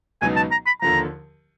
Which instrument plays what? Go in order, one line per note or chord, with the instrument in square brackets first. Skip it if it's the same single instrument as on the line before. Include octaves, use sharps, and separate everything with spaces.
[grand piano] C#2 B2 F#3 B3 D#4 [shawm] G#5
[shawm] A5
A#5
B5
[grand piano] D#2 D3 F3 [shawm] A#5